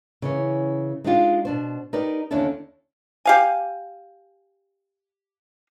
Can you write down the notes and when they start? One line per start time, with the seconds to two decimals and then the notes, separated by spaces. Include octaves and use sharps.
0.22 C#3 E3 C#4
1.04 G#3 C4 D4 D#4 F4 G4
1.45 B2 D4 C5
1.93 D#4 G4 A#4 B4 D5
2.31 D#2 D3 C#4 D4 E4 A4
3.25 G4 F5 G#5